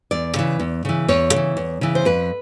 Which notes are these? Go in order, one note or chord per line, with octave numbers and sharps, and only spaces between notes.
E2 D5
C#3 E3
E2
C#3 E3
E2 C#5
C#3 E3
E2
C#3 E3
C5
F2 B4